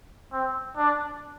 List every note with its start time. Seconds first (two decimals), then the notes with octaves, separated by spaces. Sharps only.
0.33 C4
0.77 D4